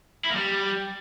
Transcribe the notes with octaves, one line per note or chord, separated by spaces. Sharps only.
E4
A#3
G3